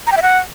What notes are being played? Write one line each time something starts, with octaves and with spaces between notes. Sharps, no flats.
A#5
G5
E5
F#5